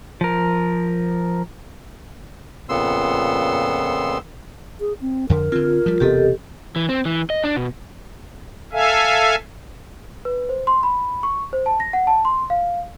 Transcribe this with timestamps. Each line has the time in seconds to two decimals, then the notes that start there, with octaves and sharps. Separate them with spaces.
0.21 F3 A#4
2.69 F2 A#2 C#3 B3 C6 E6
4.80 G#4
5.01 C4
5.30 F2 D3 A#4
5.52 D3 C4 F4
5.86 F3 G3
6.00 E1 C3 B3 G4 A4 D#5
6.76 E3
6.89 C4
7.05 E3
7.30 D#5
7.44 D4
7.56 B2
8.73 A4 E5 F5 G#5
10.25 B4
10.49 C5
10.67 C6
10.83 B5
11.23 C#6
11.53 C5
11.66 A5
11.80 A#6
11.93 F#5
12.07 A5
12.25 C6
12.50 F5